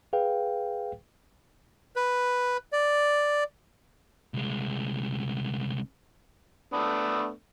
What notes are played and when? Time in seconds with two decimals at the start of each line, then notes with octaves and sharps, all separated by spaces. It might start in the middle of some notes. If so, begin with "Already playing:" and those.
0.13 G#4 B4 F5 G5
1.96 B4
2.72 D5
4.34 C2 G#3
6.73 A3 B3 D4